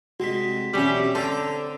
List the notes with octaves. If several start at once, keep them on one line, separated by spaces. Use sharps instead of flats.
C2 G#3 F#4 B6
B1 E2 G3 C4 C#4 E5
D3 A4 C5 G5 A5 A#5